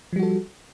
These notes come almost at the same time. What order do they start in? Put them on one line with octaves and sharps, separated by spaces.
F3 G3 F#4 A4